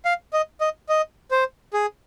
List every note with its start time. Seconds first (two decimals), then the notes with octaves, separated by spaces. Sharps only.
0.05 F5
0.33 D#5
0.61 D#5
0.89 D#5
1.31 C5
1.74 G#4